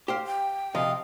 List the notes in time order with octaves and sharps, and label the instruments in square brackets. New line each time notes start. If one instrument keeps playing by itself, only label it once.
[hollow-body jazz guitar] G4 C5 F5
[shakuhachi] G5
[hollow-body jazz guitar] C3 F3 [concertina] D#5 F5